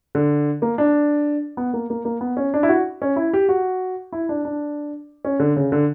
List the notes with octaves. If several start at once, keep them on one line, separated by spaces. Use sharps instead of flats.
D3
A#3
D4
B3
A#3
A#3
A#3
B3
C#4
D4
E4
F#4
C#4
E4
G4
F#4
E4
D4
D4
C#4
D3
C#3
D3